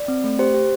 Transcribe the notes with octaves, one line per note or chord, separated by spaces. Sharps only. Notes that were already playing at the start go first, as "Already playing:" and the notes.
Already playing: D5
C4
A3
G4 C5
G4